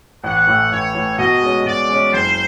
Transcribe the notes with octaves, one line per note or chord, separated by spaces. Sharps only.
A1 F#5
A2 E3
A1 C#5
A2 E3
B2 D#5
G#3 C#4
B2 D5
G#3 C#4
F#1 C5